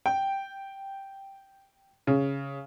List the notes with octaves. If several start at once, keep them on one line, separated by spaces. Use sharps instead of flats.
G5
C#3